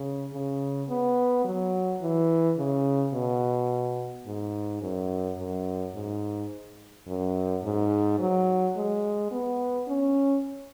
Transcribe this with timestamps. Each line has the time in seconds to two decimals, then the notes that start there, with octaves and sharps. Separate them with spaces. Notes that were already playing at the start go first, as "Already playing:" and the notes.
Already playing: C#3
0.33 C#3
0.89 B3
1.44 F#3
2.01 E3
2.57 C#3
3.14 B2
4.27 G#2
4.82 F#2
5.38 F#2
5.95 G#2
7.07 F#2
7.64 G#2
8.19 F#3
8.76 G#3
9.31 B3
9.88 C#4